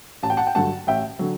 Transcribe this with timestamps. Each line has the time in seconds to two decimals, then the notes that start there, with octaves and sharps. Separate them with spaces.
0.23 A1 A5
0.30 G5
0.37 F#5 A5
0.47 G5
0.55 G2 D3 F#3 F#5 A5
0.87 A1 E5 G5
1.19 D3 F#3